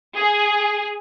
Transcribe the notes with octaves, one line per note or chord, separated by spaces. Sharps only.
G#4